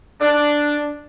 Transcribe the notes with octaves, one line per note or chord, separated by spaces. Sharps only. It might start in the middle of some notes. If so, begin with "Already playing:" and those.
D4